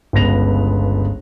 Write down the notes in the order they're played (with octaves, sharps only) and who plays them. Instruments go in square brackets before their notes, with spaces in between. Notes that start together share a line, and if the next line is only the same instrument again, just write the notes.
[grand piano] G1 C#2 B3 A#6 F7